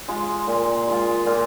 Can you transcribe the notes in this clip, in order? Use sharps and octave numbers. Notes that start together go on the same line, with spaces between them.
G#3 F4
A#2
G#3 F4
A#2